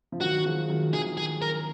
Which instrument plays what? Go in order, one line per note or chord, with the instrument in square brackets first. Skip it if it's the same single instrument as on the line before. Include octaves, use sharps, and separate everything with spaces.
[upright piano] F3
[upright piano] D#3 F#3 [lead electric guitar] F#4
[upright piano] F3 G#3
D#3 F#3
[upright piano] D#3 F#3 [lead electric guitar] G#4
[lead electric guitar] G#4
A#4